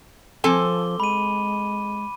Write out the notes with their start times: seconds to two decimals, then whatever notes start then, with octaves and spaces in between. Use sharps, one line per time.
0.44 F3 C4 A4 G#5 D6 G7
1.00 G#3 B5 D#7